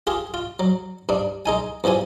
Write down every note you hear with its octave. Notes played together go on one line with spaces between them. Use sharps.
F4 G4 G#4
F4
F#3
G2 D4
G#3 D#4 G#5
E2 E3 F3 G4 G#5